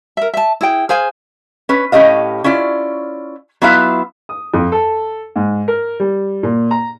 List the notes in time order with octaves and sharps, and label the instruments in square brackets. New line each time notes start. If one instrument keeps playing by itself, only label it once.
[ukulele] A#4 E5
E5 A5
E4 G#4 G5
G#4 C5 F5 G#5
[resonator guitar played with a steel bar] C#4 B4
A2 C#4 G4 D#5 F5
C#4 E4 F4 D5
F#3 B3 E4 F4 E5 F5
[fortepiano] D#6
F2
A4
G#2
A#4
G3
A#2
A#5